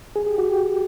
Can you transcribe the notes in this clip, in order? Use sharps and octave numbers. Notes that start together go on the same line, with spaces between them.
G#4
G4
F#4
G4